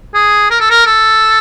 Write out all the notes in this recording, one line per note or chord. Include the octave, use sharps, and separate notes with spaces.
G#4
A#4
A4
A#4
A4